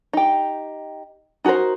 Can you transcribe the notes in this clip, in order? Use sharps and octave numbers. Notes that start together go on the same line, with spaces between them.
D#4 G4
D#4 F#4 A4 A#4 C5